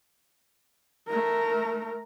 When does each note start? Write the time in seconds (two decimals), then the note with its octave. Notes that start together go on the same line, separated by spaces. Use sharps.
1.08 A3 A#4